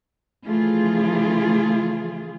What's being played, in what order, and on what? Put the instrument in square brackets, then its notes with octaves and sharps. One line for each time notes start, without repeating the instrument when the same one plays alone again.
[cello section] C#3 E3 F3 A3 F4 G#4